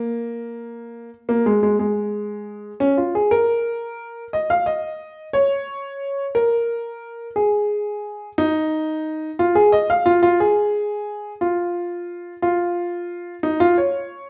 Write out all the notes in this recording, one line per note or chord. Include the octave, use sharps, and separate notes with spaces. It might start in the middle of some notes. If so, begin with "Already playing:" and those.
Already playing: A#3
A#3
G#3
G#3
G#3
C#4
F4
G#4
A#4
D#5
F5
D#5
C#5
A#4
G#4
D#4
F4
G#4
D#5
F5
F4
F4
G#4
F4
F4
D#4
F4
C#5